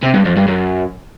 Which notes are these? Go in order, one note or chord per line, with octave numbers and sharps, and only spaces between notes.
C3
G2
F2
G2
F#2